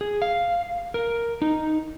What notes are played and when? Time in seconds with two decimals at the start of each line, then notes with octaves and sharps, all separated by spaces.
0.01 G#4
0.22 F5
0.94 A#4
1.42 D#4